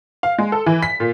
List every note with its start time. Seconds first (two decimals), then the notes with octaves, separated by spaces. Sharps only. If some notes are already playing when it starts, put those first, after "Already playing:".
0.23 F5
0.38 G#3
0.52 A4
0.66 E3
0.83 B6
1.00 A#2